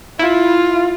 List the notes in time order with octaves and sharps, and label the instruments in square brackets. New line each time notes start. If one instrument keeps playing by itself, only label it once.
[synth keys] E4 [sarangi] F4